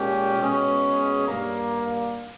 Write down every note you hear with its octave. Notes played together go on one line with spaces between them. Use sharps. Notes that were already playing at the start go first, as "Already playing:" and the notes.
Already playing: A#2 G#3 C#4 G4
B2 G#3 C#4 G#4 B4
G2 G3 A#3